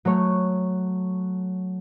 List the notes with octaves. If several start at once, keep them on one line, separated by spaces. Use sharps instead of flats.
F#3 A3 C#5